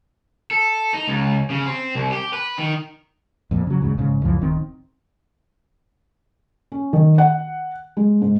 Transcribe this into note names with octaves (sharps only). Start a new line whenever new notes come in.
A4
D#4
C#2
C#3
C4
C2
G4
B4
D#3
F2 A#2
C#3 F#3
E2 G#2 C#3
A#1 G#2 C#3
C#2 F#2 E3 F3
D1 D#3 C4
C#4
D#3
F#5
G#3
G#2